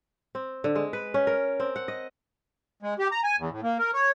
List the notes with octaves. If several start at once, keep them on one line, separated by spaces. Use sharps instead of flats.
C4
D3
G#3
B4
C#4
A#4
C4
F#5
D#5
G#3
G4
A#5
G#5
E2
A2
A#3
A#4
C#5